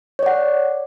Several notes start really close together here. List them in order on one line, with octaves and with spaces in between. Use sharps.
C#5 D5 F#5